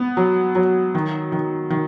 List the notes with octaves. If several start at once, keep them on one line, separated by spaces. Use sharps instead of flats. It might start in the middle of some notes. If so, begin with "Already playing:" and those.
Already playing: B3
F#3
F#3
D#3
D#3
D#3